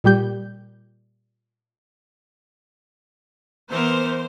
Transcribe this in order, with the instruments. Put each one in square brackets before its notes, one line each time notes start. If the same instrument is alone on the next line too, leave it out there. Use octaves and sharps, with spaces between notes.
[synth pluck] A#2 G3 G4 G6
[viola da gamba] E3 B3 A#4 [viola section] C5